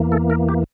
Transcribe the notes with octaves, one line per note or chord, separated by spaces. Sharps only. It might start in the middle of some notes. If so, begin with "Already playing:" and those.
Already playing: E2 E3 A#3
A4
A#4
G4